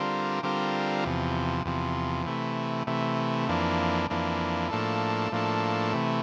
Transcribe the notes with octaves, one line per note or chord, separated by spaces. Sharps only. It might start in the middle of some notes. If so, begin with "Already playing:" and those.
Already playing: D3 G3 C4 F4 A#4
D3 G3 C4 F4 A#4
E2 C3 F3
E2 C3 F3
C3 E3 A3
C3 E3 A3
F2 E3 A#3 D4
F2 E3 A#3 D4
A2 F3 A#3 D4 A4
A2 F3 A#3 D4 A4
C3 E3 A3